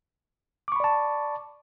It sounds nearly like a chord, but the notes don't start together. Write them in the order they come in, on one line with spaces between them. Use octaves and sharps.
D6 C#6 B5 D5 A5